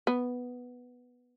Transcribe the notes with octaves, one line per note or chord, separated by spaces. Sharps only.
B3